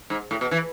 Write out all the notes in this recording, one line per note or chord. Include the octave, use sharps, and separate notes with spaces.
G#2
A2
B2
E3